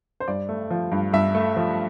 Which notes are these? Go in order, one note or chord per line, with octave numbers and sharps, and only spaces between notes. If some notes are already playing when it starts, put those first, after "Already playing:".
C5
G2 D5
A3
F3
G2
G2 E5
A3
F3